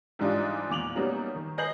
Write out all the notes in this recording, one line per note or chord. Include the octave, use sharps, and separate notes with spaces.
G#2 E3 G3 D4 D#4 F4
E2 A#2 D6 F7 F#7
F#3 G3 A#3 B3 C#4 D#4
D#3
B4 D#5 G#5 G6 C7 F#7